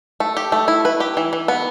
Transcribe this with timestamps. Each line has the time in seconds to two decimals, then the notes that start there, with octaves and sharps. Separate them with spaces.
0.20 A3
0.37 G4
0.52 A3
0.68 E4
0.85 B4
1.00 G4
1.17 E3
1.33 E3
1.48 B3